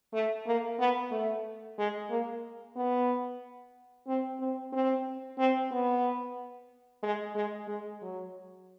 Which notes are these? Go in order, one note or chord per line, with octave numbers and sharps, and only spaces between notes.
A3
A#3
B3
A3
G#3
A#3
B3
C4
C4
C4
C4
B3
G#3
G#3
G#3
F#3